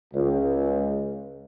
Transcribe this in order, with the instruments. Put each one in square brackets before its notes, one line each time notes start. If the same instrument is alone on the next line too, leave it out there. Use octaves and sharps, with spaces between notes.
[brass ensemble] C#2